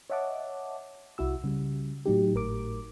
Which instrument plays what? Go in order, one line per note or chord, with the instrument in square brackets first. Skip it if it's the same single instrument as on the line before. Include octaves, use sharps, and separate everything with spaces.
[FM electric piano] C#5 D#5 E5 F#5 A5 D6
C2 E4 F#4 E6
C#3 G3
A2 F#3 D#4 G4
G#1 A2 A#4 D6